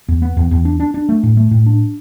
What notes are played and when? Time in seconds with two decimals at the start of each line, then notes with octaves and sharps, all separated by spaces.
0.08 E2
0.22 B3
0.37 E2
0.51 E2
0.65 D4
0.80 D4
0.94 D4
1.09 A3
1.23 A2
1.37 A3
1.51 A2
1.66 D4